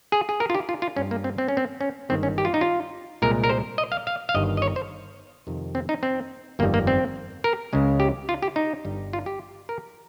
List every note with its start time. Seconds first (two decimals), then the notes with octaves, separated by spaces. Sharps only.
0.12 G#4
0.29 G#4
0.40 A#4
0.50 F4
0.55 G4
0.69 F4
0.82 F4
0.96 G2 G3 C#4
1.11 A#3
1.24 C4
1.38 C4
1.48 C#4
1.57 C4
1.81 C#4
2.09 G1 G2 D#3 G#3 C4
2.23 C#4
2.38 G4
2.45 F4
2.54 D#4
2.61 F4
3.22 C2 A#2 G#3 A#4
3.44 A#4
3.49 C5
3.78 D#5
3.92 F5
4.07 F5
4.29 F5
4.34 G1 G2 D#3 G3 D#5
4.57 D#5
4.62 C#5
4.76 C5
5.47 F2 C3 D#3
5.75 C4
5.89 D#4
6.03 C4
6.59 G1 F2 D#3 G3 A#3
6.74 A#3
6.87 C4
7.44 A#4
7.73 C#2 C#3 G#3
8.00 G4
8.29 F4
8.43 G4
8.56 D#4
8.85 G1 G2 G3
9.13 F4
9.26 G4
9.69 A#4